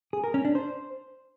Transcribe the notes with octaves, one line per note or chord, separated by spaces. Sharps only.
G#4
A#4
C#4
D4
C5